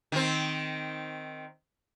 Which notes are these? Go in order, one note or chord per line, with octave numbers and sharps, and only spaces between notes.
D#3 C4